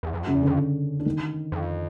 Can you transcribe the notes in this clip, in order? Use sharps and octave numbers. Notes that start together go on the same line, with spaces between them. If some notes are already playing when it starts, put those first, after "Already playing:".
E2
F2
F#2 C#3 C#4
E2
F2 D3 D4
D4
D#3 D#4
F2